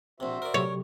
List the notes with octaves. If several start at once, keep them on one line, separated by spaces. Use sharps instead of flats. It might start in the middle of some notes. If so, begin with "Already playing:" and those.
A#1 C3 F#4 C5 E5
A#4 D5
C3 F#3 G4 C#5